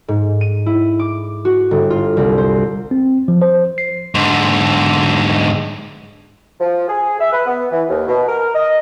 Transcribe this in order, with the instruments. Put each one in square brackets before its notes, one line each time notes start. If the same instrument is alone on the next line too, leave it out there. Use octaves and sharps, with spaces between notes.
[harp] G#2
D#7
E4
D6
F#4
G1
F4
C2
C5
[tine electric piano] C4
F3
C5
C7
[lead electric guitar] G#2 D3
[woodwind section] F3
G#4
E5
B4
B3
E3
D#2
B2
A#4
D#5